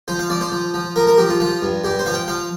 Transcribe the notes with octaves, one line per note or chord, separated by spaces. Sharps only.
F3 C5
F5
F3 D5
C5
F3
F3
F3 A#4
A#4
F3 G4
F4
F3 F4
G2
G2 G4
C5
F3 F5
G5
F3 F5